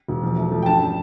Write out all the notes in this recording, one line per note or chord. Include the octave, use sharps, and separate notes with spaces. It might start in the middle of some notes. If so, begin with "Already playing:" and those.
E1
F3
A3
F3
G5
G2 A5